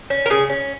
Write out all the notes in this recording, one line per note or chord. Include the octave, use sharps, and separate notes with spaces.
C#4
A#4
C#3 G#4
C#4